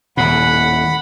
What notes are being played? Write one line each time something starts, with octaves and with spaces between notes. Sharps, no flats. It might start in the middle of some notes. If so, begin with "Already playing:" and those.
D#1 A2 F#5 B5